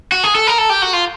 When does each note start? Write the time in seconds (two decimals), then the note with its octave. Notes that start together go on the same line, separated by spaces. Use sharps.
0.12 F#4
0.24 G#4
0.35 A4
0.47 A#4
0.58 A4
0.70 G4
0.82 F#4
0.93 F4